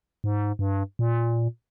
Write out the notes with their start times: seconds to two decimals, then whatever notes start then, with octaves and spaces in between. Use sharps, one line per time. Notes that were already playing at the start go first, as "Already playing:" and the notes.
0.24 G#2
0.59 G2
0.99 A#2